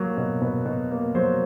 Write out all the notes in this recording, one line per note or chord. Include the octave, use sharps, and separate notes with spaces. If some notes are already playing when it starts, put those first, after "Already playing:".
Already playing: F#3 A#3
B2
B2 B4
B2
A#3
F#3 C5